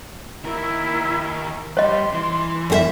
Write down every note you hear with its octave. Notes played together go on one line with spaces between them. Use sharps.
D#2 E4 A#4
G2 G3 C#5 D#5 C6
E3
F#2 G#4 E5